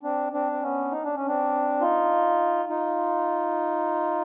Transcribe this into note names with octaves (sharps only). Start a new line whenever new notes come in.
C4 D4
C4 D4
C4
B3 C#4
D#4
D4
C#4
C4 D4
D#4 F4
D#4 F4